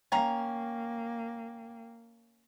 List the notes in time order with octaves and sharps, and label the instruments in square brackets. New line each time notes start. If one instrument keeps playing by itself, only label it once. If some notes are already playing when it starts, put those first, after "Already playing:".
[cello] A#3 [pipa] C#4 F5 A#5 [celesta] G5